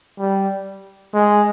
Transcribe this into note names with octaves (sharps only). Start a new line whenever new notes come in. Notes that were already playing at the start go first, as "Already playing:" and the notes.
G3
G#3